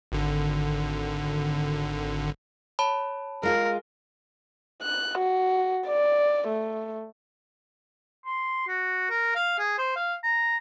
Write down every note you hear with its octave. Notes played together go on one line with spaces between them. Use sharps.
G#1 D3
C#5 A5 B5
G#3 F4 G#4 A#4
F#6
F#4
D5
A3
C6
F#4
A#4
F5
G#4
C5
F5
A#5